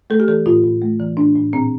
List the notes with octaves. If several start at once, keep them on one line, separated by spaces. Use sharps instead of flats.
A3 A4
G4
E3 A4
A2 F4
A2
A3
E3
A2 D4
A2
A#2 C4